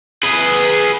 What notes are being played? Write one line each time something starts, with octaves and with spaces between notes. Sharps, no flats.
G#4 B4